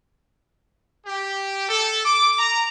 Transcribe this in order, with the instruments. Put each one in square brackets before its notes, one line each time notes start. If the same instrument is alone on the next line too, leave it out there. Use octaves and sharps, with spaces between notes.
[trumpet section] G4
A4
D6
A#5